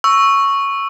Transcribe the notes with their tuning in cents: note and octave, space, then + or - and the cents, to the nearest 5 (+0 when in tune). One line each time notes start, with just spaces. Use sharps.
C#6 +0 E6 +0